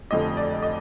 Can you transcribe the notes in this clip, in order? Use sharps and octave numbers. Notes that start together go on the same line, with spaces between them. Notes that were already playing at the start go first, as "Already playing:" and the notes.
F1 F2 D3 F3 D#5
D5
D#5